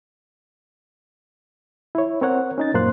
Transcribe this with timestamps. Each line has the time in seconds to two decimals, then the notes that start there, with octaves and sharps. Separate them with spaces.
1.95 E4 C#5
2.21 C4 A#4 C#5 F#5
2.58 C#4 D#4 A6
2.74 F#2 A#2 A#3 C5 C6 F#6